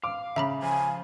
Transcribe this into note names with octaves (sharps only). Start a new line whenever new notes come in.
F5 D6
C#3 E5 A#5 B5
F3 G#5